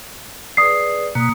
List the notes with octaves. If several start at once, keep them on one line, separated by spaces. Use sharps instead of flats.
G#4 B4 D5 D#6 C7
B2 A#3 D#6